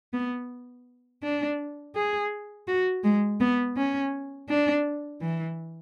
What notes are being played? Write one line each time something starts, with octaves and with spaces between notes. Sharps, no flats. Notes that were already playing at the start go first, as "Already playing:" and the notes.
B3
D4
G#4
F#4
G#3
B3
C#4
D4
E3